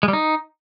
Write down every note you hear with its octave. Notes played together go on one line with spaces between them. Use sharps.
G#3
G3
D#4